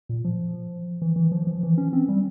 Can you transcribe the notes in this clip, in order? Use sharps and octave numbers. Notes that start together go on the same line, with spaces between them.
A#2
F3
E3
E3
F3
F3
E3
C#4
C4
G3